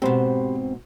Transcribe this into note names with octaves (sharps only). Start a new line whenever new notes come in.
G#2 B2 C4 G4 C5 B5